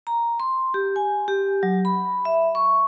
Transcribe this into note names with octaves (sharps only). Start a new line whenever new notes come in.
A#5
C6
G4
G#5
G4
F#3
B5
E5
C#6